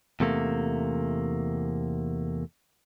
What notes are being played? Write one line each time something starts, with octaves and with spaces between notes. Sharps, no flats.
E2 C3 A3 A#3